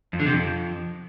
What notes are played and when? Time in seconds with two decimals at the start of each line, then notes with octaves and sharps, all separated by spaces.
0.13 F2
0.20 D3
0.26 C3
0.33 F2